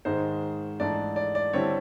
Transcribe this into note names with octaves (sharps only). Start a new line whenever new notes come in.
G#2 D#3 G#3 C5
G#2 E3 A3 D4 D5
D5
D5
D3 G3 C4 E4 C#5